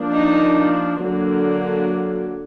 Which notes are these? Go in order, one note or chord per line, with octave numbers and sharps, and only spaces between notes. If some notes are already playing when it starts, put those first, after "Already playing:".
Already playing: F3 A#3 D4
D#4
D3 F#3 A#3 D4